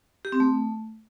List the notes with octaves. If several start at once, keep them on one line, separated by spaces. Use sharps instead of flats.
G4
C4
A3